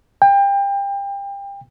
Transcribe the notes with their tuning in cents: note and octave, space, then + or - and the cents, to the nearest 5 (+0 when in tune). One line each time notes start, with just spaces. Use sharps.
G5 +30